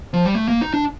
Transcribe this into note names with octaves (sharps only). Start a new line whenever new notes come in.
F3
G3
A3
A#3
D#4
D4